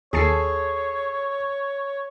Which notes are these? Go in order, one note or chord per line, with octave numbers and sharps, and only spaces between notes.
D#2 G#4 A4 C#5 A5 C7